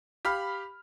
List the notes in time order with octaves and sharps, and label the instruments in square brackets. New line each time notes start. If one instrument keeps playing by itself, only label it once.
[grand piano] G4 F5 B5 F6